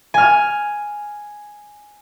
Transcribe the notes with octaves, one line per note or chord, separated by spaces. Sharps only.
G#5 F6